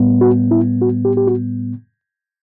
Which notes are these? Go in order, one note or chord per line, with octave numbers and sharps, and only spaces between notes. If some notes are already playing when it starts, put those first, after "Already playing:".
Already playing: A2 G3 B3
F#4
E4
F#4
G4
G4
F#4